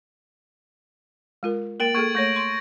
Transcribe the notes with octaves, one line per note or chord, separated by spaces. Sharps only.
G#3 F4 A#4
A#3 A#4 G5 A6 D7 F#7
A#3 G#4 A4 C#6 G#6 D7
A3 C#5 C#6 G6 A#6
C6